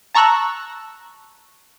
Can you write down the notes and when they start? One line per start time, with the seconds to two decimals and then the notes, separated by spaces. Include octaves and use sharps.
0.15 A5 A#5 C#6 E6 F#6